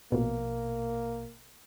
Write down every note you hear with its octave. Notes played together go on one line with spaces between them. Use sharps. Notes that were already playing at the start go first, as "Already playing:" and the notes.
A#1 B2 A#3